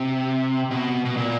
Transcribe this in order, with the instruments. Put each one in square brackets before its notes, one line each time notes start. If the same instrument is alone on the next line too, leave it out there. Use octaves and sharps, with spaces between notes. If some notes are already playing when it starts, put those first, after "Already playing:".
Already playing: [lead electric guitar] C3
B2
B2
A#2